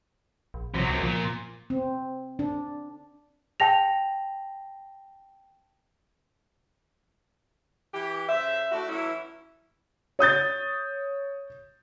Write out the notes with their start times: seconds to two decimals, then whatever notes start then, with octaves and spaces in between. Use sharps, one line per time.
0.54 A#1
0.74 C3 F3 F#3
0.89 C2 F#2 C3
1.02 A#2 F3
1.70 C4
2.39 D4
3.60 G5 A5 A#6 F7
7.94 E3 G4
8.29 C#3 C5 E5
8.71 A3 D4 E4 F#4
8.89 E3 F#3 C#4 E4
10.19 C#5 D#6 G6 A6